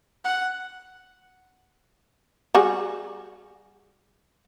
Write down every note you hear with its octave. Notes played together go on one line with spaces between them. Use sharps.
F#5
G3 F#4 G#4